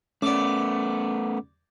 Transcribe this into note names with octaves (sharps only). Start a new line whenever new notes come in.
A3 B3 C#4 D5 D6